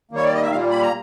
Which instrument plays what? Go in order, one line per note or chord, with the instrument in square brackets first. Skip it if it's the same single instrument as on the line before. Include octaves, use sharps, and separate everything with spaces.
[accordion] D#3 G3 A#3 C#5
D5
D#5
E5
A#2 G3 A#3 F5
B5
A#5